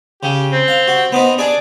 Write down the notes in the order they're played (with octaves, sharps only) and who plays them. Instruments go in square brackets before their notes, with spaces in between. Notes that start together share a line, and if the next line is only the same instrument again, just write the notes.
[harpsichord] C#3 [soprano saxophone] G4
[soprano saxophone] C4
[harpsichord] F5
F#4
B3 C4 D#4
[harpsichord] D4 G#4 D6 [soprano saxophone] D5